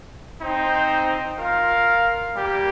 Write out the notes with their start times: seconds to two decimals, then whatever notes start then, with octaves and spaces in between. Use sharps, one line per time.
0.41 C4 D#4 C5 G5
1.38 F4 A#4 F5
2.36 G3 A#3 G4